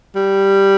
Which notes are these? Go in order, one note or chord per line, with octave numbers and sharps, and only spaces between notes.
G3